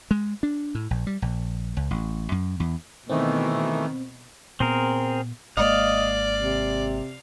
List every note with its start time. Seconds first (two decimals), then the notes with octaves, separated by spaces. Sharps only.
0.11 G#3
0.43 D4
0.75 A2
0.91 A#1
1.07 G3
1.22 A#1
1.77 C#2
1.91 A1
2.32 F#2
2.60 E2
3.09 B2 D#3 E3 A3 C4
4.60 A#2 B3 C4 G#4 A#4
5.57 G#1 G#3 A#3 D5 D#5 F5
6.41 C3